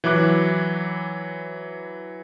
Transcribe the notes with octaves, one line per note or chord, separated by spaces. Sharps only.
E3 F#3 E4 D6 F#6